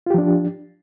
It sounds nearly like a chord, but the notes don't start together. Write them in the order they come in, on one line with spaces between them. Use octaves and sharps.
F4 G4 F3 D4